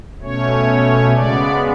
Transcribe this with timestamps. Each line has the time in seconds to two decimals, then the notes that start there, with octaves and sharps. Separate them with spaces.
0.21 B2 A3 C#4 C#5
1.14 C#3 G#3 B3 D5